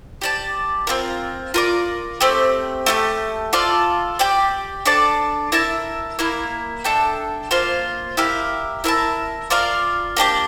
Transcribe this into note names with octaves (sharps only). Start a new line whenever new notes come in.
G4 D5 A5
C4 F4 A#4
F4 A#4 D5
A3 C4 G4
A3 E4 G4
F4 A4 D5 F5
G4 D5 G5
D4 A4 D5 A5
E4 A#4 E5 A5
A#3 E4 A#4
D4 A4 E5 G5
A#3 F4 C5 F5
E4 G4 A#4 F5
E4 A#4 E5 A5
F4 A#4 D5 F5
A#3 D4 G4 D5